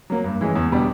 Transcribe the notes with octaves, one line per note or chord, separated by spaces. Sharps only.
F#3 A#3
G2
E3 G#3 C#4
E2
B2 G3 B3 D4